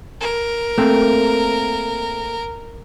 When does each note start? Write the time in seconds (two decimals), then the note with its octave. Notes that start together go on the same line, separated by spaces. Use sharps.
0.21 A#4
0.78 A3 A#3 C4